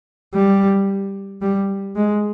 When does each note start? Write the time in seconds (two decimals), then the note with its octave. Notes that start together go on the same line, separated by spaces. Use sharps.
0.34 G3
1.42 G3
1.95 G#3